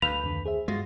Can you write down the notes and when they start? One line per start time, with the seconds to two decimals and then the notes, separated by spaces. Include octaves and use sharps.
0.02 D2 B4 F5 G6 F7
0.24 F2 D3 D#3
0.46 G#4 C5 E5
0.68 G2 G#3 F4 F#4 A#6